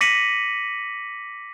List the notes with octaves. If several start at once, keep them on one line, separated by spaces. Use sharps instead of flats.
D6 A#6 B6 C#7 D#7 F#7